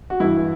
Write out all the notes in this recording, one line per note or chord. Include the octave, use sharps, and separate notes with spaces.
F#4
G2 E3 E4